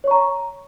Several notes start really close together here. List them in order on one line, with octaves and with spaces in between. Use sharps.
C#5 C#6 A#5